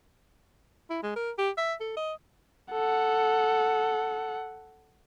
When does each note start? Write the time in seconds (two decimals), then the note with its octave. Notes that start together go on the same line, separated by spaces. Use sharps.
0.90 E4
1.03 G#3
1.16 A#4
1.38 G4
1.58 E5
1.80 A4
1.97 D#5
2.71 A4 F#5